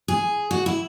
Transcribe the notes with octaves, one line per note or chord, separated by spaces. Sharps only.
G#4
F#4
E4